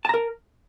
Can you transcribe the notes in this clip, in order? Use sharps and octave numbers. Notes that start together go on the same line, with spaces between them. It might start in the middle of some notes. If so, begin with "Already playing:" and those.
A#4 A5 A#5